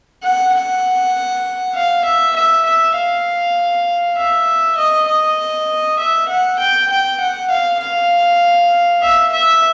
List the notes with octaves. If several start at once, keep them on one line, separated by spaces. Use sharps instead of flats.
F#5
F#5
F5
E5
E5
E5
F5
E5
D#5
D#5
E5
F#5
G5
G5
F#5
F5
F5
E5
E5